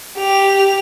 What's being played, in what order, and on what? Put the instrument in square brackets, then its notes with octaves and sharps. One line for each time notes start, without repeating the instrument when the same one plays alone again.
[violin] G4 F7